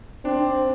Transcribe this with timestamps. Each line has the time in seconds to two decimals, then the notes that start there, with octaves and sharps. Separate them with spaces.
0.25 C4 D4